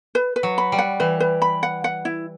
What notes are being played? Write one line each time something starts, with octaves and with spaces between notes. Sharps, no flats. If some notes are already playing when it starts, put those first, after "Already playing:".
B4
B4
F#3
B5
G3
F#5
E3 B4
B4
B5
F#5
F#5
E4